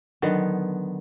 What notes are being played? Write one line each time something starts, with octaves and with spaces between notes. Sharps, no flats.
D3 D#3 F#3 B3